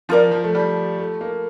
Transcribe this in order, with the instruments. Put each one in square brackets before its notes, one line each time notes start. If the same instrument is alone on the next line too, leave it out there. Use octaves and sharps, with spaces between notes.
[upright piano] F3 [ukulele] F4 A#4 D5
[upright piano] F3
A3
G3
A3
A#3